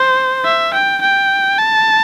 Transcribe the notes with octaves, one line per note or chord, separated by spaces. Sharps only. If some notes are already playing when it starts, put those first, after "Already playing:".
Already playing: C5
E5
G5
G5
A5